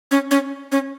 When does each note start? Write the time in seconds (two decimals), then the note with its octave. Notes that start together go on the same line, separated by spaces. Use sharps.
0.11 C#4
0.31 C#4
0.72 C#4